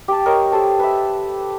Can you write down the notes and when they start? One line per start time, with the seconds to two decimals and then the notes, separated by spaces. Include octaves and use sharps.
0.08 G4 A5
0.26 A#4 C#5 D#5 C#6
0.52 G4 A4 C5 A5
0.79 B4 E5